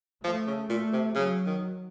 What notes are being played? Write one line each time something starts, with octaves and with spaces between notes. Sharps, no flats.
F3 A3
C#3
A#2 A3
C3
C#3 F#3
D#3